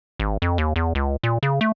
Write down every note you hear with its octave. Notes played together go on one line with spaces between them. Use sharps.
G#1
F2
D#2
E2
C#2
A#2
C#3
A3